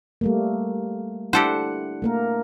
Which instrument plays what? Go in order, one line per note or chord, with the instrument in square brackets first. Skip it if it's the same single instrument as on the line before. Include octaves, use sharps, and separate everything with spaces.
[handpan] G3 A3 A#3
[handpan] D4 E4 F#5 [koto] G4 A4 C5
[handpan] A3 A#3 A#4